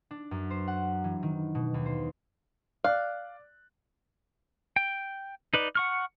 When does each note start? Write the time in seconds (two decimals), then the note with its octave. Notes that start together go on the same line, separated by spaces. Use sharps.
0.11 D4
0.31 F#2
0.50 C5
0.68 F#5
1.04 E3
1.23 D#3
1.55 B2
1.74 D#2
1.86 C5
2.84 D5 F5 F#6
4.76 G5
5.54 D#4 B4 D5
5.75 F#5 C#6 F6